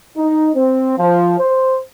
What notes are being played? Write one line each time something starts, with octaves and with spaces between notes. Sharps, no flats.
D#4
C4
F3
C5